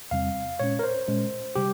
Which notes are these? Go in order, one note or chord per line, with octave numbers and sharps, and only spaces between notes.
E2 C3 G3 C4 F5
A#2 G#3 C#4 C#5
A#4
C5
A#2 G#3 C#4
C3 G3 G4